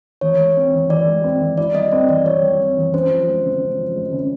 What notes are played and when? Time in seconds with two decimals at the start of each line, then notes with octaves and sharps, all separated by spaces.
0.21 E3 C#5
0.38 G#3
0.57 C4
0.74 E3
0.89 E3 D5
1.06 G#3
1.24 C4
1.41 E3
1.58 E4 D5
1.74 G3 D#5
1.92 C4 D5
2.09 E3 D5
2.25 E4 C#5
2.42 G3
2.60 C4
2.77 E3
2.93 C#4 C5
3.10 F3
3.27 G#3
3.45 C#3
3.62 C#4
3.78 F3
3.96 G#3
4.13 C#3